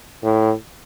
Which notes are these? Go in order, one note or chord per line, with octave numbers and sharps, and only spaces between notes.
A2